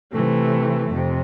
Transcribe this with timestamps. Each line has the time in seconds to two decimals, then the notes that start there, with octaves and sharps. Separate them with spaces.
0.12 C3 E3 A3
0.91 F2 C3